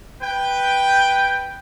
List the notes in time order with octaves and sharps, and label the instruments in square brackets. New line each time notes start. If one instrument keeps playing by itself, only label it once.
[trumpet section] B4 G5